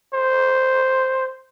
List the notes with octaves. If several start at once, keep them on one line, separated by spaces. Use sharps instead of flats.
C5